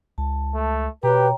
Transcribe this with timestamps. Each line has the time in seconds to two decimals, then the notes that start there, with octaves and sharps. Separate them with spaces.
0.18 C#2 A5
0.54 A3
1.03 B2 G4 B4 C#5 G5 A#5